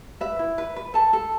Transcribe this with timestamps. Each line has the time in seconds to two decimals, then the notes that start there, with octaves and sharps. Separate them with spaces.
0.21 B4 E5
0.39 E4
0.58 B4
0.76 B4
0.94 A4 A5
1.13 A4